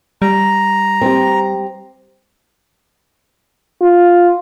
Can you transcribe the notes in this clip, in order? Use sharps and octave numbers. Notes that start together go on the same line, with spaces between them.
G3 A#5
C4 G4
F4